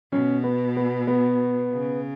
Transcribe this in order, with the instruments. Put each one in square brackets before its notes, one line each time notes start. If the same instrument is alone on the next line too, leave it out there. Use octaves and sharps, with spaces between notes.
[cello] B2 [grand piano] C#4
[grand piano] B3
B3
B3
[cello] C#3